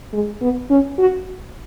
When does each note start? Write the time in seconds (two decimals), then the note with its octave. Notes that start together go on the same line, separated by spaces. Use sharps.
0.13 G#3
0.41 B3
0.70 C#4
0.98 F#4